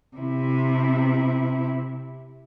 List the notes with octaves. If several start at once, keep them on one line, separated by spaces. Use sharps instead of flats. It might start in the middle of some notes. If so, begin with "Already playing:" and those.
C3 E4